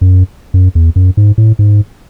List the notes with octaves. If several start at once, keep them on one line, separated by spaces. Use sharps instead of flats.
F#2
F#2
E2
F#2
G#2
A2
G#2